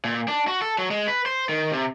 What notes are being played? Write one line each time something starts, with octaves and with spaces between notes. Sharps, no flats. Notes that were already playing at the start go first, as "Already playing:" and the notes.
A#2
D4
F#4
A4
F#3
G#3
B4
C5
D#3
C3